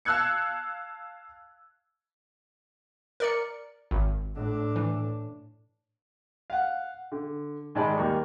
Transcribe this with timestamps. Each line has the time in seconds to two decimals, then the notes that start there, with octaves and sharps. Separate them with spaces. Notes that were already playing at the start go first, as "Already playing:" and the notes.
0.05 F5 A5 E6 F#6 G#6 C#7
3.20 A#4 D5 C#7
3.91 G#1
4.35 A2 D4
4.76 E3
6.50 F5 F#5
7.12 D3
7.75 G#2 D#3 G#3 D5 A5 B5
7.98 D#2 G3 A#3 C#6